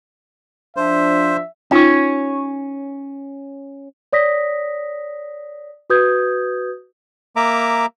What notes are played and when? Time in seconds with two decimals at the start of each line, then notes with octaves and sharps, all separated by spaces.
0.77 F3 D4 C5 E5
1.71 C#4 D#4 F4 C#5 G5
4.13 C#5 D5 D#6 A#6 B6
5.90 F#4 B4 D#6 G6 G#6
7.36 A#3 E5 A#5 D6